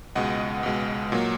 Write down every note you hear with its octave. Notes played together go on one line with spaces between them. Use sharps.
C#2 B2 G#3 D#5 F#5
C#2 B2 G#3
A#2 F#3 A#3